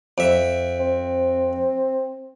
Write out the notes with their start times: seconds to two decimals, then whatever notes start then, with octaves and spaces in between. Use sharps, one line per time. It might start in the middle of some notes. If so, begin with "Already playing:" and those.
0.18 F2 E5
0.80 C4